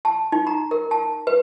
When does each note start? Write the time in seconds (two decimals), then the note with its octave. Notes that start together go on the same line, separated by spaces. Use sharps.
0.05 A5
0.32 D#4
0.47 A#5
0.71 A#4
0.91 A5
1.27 B4